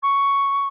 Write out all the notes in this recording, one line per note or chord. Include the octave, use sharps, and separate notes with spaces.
C#6